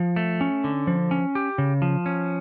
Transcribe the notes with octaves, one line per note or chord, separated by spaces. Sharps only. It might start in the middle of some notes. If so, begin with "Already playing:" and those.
Already playing: F3
A3
C#4
D3
F3
C#4
G4
C#3
F3
C#4